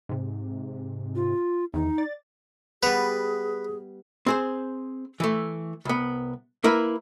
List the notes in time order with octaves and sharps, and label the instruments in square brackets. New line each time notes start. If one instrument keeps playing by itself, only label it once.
[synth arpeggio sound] G#2 C3
[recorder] F4
[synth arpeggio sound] E2 D#3 [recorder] D#4
[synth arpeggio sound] D5 A6
[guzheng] G3 B3 [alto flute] G#4 [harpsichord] B4
[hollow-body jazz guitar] C4 G#4 C5
E3 A3
C2 B3
A#3 E4 A#4 B4